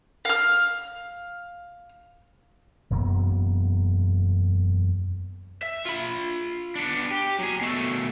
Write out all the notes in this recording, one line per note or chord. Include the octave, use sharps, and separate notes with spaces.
F5 F6
E1 F#2 A#3 B3
E5
F4 B5
B3 D4
G4
F#3 G#4
B2 A3